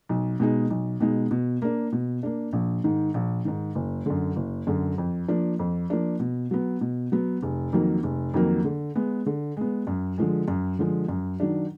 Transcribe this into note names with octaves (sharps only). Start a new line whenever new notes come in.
B1
B2 G#3 D#4
B1
B2 G#3 D#4
B2
A#3 D4
B2
A#3 D4
A#1
G#2 D#3
A#1
G#2 D#3
F#1
F#2 D3
F#1
F#2 D3
F2
F3 A#3 D4
F2
F3 A#3 D4
B2
F#3 B3
B2
F#3 B3
F1
F2 D#3 F#3 A#3
F1
F2 D#3 F#3 A#3
D3
G#3 B3
D3
G#3 B3
F#2
D3 F3 G#3
F#2
D3 F3 G#3
F#2
D#3 F#3 D4